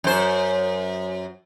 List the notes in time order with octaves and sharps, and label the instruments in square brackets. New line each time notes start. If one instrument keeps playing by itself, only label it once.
[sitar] F#2 C5